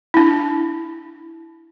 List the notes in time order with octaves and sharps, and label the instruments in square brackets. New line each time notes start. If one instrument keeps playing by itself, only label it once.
[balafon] D4 E4